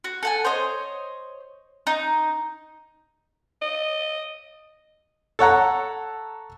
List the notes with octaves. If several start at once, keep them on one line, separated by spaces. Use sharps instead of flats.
F#4
A4 F#5 G#5
C5 C#5 D#5
D#4
D#5
A4 C#5 F#5 A#5